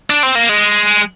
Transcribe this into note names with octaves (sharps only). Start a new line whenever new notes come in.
D4
C4
A#3
G#3